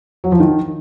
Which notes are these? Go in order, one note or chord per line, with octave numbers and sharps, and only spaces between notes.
F#3
F3
D#3